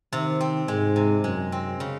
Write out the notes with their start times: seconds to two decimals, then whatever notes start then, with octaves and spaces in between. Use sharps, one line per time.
0.13 C3 D#3
0.41 C4
0.68 G#2 G#3
0.96 C3
1.24 F#2 G#3
1.52 C4
1.80 C#3